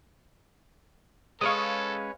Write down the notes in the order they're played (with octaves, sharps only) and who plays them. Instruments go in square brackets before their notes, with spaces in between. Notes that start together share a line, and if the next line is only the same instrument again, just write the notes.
[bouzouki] G#3 C#4 F5 [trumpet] A4 [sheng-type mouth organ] B4 C#5 [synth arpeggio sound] C#6 D#6